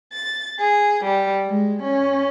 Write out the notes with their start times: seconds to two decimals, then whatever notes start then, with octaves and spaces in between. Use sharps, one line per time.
0.12 A6
0.59 G#4
1.04 G3
1.45 G#3
1.83 C#4